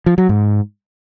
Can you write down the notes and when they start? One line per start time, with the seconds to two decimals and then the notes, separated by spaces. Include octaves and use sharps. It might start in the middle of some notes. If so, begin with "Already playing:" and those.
0.06 F3
0.18 F#3
0.29 G#2